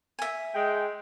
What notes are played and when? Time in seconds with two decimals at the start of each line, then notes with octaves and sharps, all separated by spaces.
0.19 E5 G#5
0.54 G#3 G5